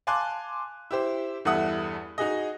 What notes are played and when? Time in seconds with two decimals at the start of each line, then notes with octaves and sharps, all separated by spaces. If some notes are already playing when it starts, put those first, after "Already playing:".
0.07 F5 G#5 A5 C6 D6 F#6
0.91 E4 G4 C5
1.45 E2 G2 A4 E5 F#5 D#6
2.18 D#4 F#4 G#4 D#5